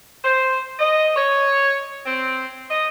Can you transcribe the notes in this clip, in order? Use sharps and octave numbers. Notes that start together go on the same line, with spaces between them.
C5
D#5
C#5
C4
D#5